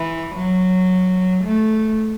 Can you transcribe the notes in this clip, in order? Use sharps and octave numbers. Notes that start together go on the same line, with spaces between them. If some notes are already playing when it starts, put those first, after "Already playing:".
Already playing: E3
F#3
A3